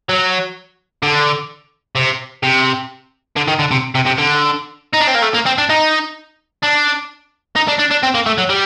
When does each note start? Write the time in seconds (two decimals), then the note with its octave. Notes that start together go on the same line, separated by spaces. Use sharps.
0.09 F#3
1.03 D3
1.95 C3
2.43 C3
3.36 D3
3.48 D#3
3.59 D3
3.71 C3
3.95 C3
4.06 C3
4.18 D3
4.94 D#4
5.01 D4
5.08 C4
5.15 A#3
5.23 A3
5.34 A#3
5.46 C4
5.58 D4
5.70 D#4
6.63 D4
7.56 D#4
7.68 D4
7.79 D4
7.91 D4
8.03 C4
8.15 A#3
8.26 A3
8.38 F#3
8.50 G3